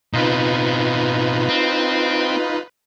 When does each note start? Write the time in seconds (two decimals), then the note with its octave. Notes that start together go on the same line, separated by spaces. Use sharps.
0.13 B2 C4 D#4 F4 B4
1.49 C4